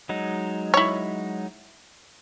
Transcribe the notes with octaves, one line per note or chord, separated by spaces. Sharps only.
F#3 G#3 D#4
E4 C#5